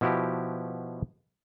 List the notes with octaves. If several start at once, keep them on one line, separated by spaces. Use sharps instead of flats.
B2 F3 E4 F#4 G4